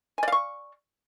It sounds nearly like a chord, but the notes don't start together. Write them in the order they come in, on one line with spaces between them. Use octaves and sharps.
G#5 D5 F5 C#6